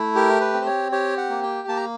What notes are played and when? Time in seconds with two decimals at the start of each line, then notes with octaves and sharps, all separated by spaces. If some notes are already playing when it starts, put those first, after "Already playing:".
Already playing: A3 E4
0.15 G4 A#4
0.41 B4
0.53 C4
0.61 C5
0.66 C#5
0.92 G4 C#5
1.17 F#5
1.30 A#3
1.43 G5
1.68 A#3 A5
1.77 A#5